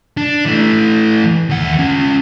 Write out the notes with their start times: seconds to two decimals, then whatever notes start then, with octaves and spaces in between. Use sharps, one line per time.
0.17 D4
0.45 E3 A3
1.49 D#2 F#5
1.78 C#4 F4